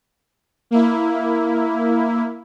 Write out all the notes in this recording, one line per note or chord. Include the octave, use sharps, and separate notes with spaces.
A#3 E4